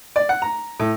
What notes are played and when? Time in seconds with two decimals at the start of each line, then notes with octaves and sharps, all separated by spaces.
0.16 D5
0.29 F#5
0.42 A#5
0.80 A2